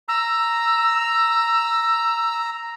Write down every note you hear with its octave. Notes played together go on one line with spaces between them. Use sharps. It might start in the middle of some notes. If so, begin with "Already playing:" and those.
A#5 E6